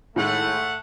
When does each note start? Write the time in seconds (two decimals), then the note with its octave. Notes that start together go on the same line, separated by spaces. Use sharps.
0.16 A2 D#3 G#3 A3 F#5